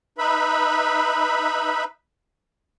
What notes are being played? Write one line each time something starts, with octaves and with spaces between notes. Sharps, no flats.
D#4 B4 E5 B5